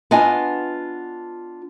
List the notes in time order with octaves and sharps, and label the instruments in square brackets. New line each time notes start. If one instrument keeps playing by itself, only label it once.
[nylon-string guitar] B3 D4 F4 D#5 G#5 A5